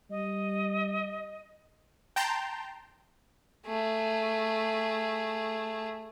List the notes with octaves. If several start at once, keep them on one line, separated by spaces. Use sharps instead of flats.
G3 D#5
G5 A5 A#5 C6 G6
A3 G#4